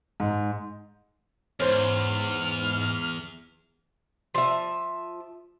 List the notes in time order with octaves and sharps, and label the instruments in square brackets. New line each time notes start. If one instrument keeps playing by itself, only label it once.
[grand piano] G#2
[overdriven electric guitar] E2 [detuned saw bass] G#2 [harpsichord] C#4 C5 [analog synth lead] F6
[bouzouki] F3 E5